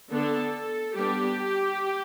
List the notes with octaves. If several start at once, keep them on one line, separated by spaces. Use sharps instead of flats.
D3 B3 D4 A4
G3 B3 D4 G4